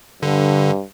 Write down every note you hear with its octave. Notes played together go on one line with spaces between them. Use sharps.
G2 D3